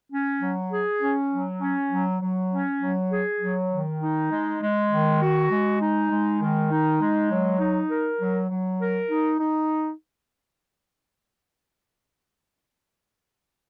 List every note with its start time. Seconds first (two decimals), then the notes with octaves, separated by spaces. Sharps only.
0.11 C#4
0.42 F#3
0.71 G#4
1.02 C#4
1.31 F#3
1.61 C#4
1.91 F#3
2.21 F#3
2.51 C#4
2.81 F#3
3.11 G#4
3.40 F#3
3.71 D#3
4.00 D#4
4.30 G#3
4.61 G#3
4.91 D#3
5.21 F#4
5.50 G#3
5.80 D#4
6.10 G#3
6.40 D#3
6.70 D#4
7.00 G#3
7.30 F#3
7.60 D#4
7.89 A#4
8.20 F#3
8.50 F#3
8.80 A#4
9.10 D#4
9.40 D#4